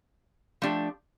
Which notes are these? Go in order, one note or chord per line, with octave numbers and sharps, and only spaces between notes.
F3 A3 D4 G4